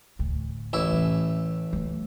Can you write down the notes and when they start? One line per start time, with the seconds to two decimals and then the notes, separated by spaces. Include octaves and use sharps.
0.19 D2 A2
0.73 A1 E4
0.92 A2 F4
1.73 F#3 A3